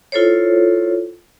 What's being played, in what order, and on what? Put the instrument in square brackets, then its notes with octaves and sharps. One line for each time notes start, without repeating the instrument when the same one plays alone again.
[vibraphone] E4 F4 A4 C5 C#5